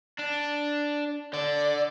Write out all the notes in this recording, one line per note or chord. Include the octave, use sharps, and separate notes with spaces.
D4
D3 D5